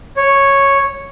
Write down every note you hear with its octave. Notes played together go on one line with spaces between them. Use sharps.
C#5